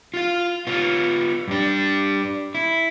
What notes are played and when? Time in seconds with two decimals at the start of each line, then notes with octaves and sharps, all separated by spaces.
0.14 F4 F5
0.67 B3 F4
1.48 G2 D4
2.55 E4